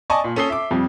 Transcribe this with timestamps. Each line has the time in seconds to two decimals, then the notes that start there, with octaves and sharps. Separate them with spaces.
0.10 D5 D#5 G#5 A5 C#6 D#6
0.24 A#2
0.36 C#4 A4 D#6 C7 G7
0.50 E5 D6
0.71 F2 G3